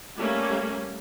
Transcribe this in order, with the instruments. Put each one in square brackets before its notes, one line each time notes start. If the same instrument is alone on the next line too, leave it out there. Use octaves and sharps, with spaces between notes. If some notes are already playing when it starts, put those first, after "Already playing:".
[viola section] G3 A3 A#3 C#4